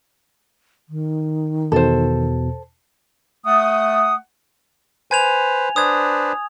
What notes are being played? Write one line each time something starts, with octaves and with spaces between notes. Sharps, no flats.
D#3
E2 B2 A4 C5
A3 F#5 D#6
B4 C5 G#5 G#6 F7
D4 B4 C5 D#6 G#6